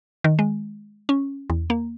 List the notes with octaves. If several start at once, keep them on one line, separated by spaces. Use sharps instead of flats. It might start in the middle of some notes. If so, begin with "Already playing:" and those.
D#3
G#3
C#4
E2
A#3